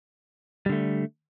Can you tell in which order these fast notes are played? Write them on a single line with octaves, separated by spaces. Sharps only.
G3 D3 A3